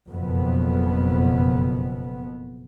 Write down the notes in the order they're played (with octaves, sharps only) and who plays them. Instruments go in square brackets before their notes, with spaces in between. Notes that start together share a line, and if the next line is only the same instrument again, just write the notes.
[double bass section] F#1 F2 B2 B3